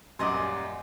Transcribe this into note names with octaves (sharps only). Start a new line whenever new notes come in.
D#1 F#2 G3 D#5 F#5 C6 D6